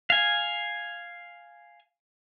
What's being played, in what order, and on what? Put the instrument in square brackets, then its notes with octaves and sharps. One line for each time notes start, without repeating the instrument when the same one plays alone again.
[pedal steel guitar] F5 G#5